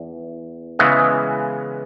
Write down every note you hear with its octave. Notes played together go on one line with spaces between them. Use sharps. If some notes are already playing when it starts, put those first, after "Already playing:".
Already playing: E2
C#3 E3 G#3 B3